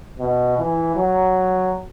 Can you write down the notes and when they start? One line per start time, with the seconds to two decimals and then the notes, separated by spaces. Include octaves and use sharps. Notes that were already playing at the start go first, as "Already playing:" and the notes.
0.19 B2
0.58 E3
0.96 F#3